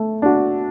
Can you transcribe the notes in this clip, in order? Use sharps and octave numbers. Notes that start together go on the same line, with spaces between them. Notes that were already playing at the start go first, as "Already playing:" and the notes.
Already playing: A3
D4 F#4